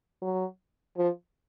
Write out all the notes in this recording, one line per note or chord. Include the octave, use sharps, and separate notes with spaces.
F#3
F3